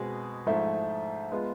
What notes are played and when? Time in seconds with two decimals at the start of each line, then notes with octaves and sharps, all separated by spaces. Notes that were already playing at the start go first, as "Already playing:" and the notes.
Already playing: B2 G#3 C4 G#4
0.46 G#2 F3 A3 E4
1.32 G#3 B3 F4